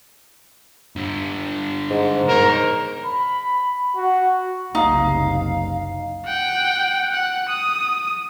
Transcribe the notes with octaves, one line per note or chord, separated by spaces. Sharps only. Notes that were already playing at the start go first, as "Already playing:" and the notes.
G2 D3
G#2
A#4 C5 C#5
B5
F#4
F#1 C2 D#4 F5
F#5 G5
F#5
D#6